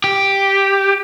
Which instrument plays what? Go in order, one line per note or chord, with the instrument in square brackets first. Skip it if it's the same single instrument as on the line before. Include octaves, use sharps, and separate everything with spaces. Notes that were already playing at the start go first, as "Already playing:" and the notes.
[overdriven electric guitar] G4